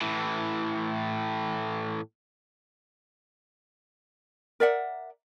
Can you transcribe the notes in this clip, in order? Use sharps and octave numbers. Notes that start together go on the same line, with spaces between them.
A2 E3
A#4 D5 E5 F#5